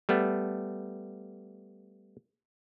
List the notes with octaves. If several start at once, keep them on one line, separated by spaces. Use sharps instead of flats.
G3 A3 B3